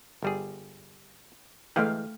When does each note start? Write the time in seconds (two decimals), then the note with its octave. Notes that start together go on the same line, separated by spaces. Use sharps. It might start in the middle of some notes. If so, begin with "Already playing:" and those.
0.22 G1 G3 G#4
1.76 E3 G#3 A3 F5 G5